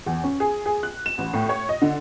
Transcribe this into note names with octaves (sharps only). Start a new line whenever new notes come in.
E2
C#4
G#4
G#4
F#6
E7
A1
A2
C#5
D#5
D3